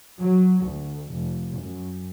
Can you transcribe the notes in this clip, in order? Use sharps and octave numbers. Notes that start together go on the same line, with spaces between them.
F#3
D2
F1
F#2